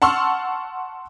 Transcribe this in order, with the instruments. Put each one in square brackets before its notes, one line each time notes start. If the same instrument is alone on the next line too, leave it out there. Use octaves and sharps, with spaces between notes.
[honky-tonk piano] F#5 A5 C6 C#6 E6 F6